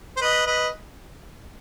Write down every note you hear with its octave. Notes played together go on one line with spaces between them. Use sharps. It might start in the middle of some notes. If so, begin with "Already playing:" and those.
C5
B4 D#5
B4 D#5